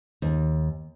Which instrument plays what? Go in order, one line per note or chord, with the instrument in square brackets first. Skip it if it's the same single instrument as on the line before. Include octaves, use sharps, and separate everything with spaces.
[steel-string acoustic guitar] D#2